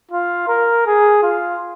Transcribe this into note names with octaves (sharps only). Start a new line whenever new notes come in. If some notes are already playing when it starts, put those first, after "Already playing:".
F4
A#4
G#4
F4